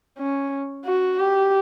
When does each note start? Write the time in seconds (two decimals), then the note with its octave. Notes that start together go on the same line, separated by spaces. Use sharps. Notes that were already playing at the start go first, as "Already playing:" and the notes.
0.18 C#4
0.85 F#4
1.19 G4